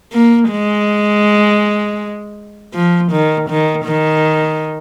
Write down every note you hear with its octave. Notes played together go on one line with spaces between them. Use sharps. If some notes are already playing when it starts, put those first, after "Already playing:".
A#3
G#3
F3
D#3
D#3
D#3